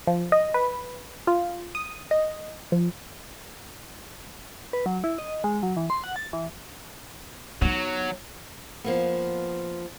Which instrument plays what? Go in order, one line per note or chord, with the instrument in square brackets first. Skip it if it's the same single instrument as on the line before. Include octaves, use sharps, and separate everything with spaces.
[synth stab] F3
D#5
B4
F4
D#6
D#5
F3
[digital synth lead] B4
F#3
E4
D#5
G#3
F#3
E3
C6
F#5
A6
E3
[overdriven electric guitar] F#3 [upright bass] B3 D#4
[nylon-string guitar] F3 A#3 B3